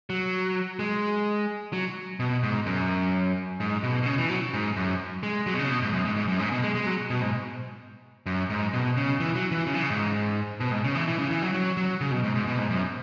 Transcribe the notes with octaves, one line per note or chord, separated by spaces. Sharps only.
F#3
G#3
F#3
B2
G#2
F#2
G#2
B2
B2
C#3
E3
F#3
G#2
F#2
G#3
F#3
B2
C#3
B2
G#2
F#2
G#2
G#2
F#2
G#2
B2
G#3
G#3
F#3
B2
G#2
F#2
G#2
B2
C#3
E3
F#3
E3
C#3
E3
C#3
G#2
B2
G#2
C#3
E3
E3
C#3
E3
F#3
F#3
F#3
C#3
B2
G#2
G#2
B2
G#2
F#2